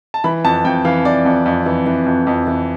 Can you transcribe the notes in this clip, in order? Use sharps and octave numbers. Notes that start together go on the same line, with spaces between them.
A5
E3 B5
F2 A5
F2 G5
E3 F5
E3 D5
F2
F2
E3
E3
F2
F2
E3